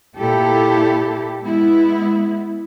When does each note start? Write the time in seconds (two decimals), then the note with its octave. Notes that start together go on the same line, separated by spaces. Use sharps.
0.18 A#2 E4 G4 A4
1.41 G#3 B3 E4